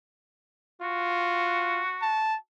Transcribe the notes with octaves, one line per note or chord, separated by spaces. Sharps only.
F4 F#4
A5